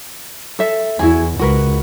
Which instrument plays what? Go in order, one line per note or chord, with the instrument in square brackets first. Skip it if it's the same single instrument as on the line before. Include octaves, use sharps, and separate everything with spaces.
[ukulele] A4 E5
[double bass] E2 [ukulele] E4 F#4 G#4
[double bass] C#2 [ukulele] F#4 A#4 B4